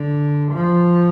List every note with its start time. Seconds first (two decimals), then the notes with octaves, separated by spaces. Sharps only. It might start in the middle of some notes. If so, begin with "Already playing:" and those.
Already playing: D3
0.53 F3